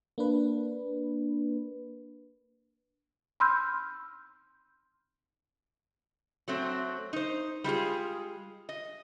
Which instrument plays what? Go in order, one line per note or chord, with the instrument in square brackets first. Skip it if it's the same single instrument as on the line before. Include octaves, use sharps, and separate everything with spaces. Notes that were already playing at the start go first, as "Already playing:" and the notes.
[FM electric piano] A#3 D4 B4
[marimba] B5 C6 E6 F6 G6
[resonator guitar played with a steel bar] F#3 A3 C4
D#4 C5
G3 G#3 F4 G#4
D#5